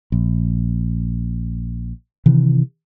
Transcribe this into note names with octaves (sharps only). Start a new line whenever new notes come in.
A#1
C3 D#3 E3